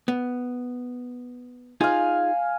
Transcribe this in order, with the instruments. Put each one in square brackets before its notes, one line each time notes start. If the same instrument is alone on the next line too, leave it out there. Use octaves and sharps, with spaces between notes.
[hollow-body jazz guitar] B3
[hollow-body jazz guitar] D#4 F4 G#4 [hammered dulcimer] F5 G#5